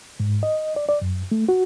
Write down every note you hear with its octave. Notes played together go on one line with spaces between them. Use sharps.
G#2
D#5
D5
D5
F#2
A3
F#4